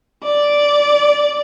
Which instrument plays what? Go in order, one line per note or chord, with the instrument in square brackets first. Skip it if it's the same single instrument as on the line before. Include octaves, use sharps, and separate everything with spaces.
[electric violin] D5